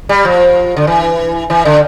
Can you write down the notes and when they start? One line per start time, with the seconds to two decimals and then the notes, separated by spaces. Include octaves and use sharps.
0.09 G3
0.25 F3
0.77 D3
0.87 E3
1.50 E3
1.65 D3